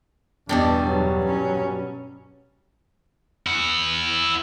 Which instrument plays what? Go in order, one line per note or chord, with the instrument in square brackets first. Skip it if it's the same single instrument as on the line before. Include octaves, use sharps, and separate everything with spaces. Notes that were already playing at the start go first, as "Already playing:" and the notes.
[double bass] E2 [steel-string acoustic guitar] G2 B2 G3 [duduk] D4
[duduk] F#3
[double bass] C#4
[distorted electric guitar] E4 F#5